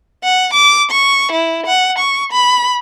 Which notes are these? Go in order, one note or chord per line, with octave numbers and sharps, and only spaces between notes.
F#5
D6
C#6
E4
F#5
C#6
B5